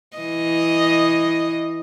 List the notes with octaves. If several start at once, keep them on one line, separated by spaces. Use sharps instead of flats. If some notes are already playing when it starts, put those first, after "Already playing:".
E3 D#5